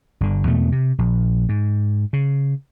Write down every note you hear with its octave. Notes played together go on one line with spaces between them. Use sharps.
G1 D3
E2 B2 A3
C3
A#1
G#2
C#3